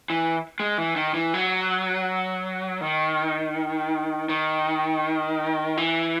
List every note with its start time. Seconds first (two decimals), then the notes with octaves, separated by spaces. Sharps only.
0.10 E3
0.60 G#3
0.78 E3
0.96 D#3
1.15 E3
1.34 F#3
2.81 D#3
4.29 D#3
5.77 E3